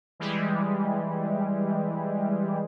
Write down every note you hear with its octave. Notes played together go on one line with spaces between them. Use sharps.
E3 G3 G#3